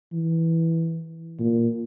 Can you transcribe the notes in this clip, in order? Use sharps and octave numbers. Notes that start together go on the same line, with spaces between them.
E3
A#2